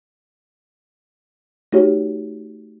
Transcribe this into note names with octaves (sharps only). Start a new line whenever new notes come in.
A3 D#4 F#4 G4 C#5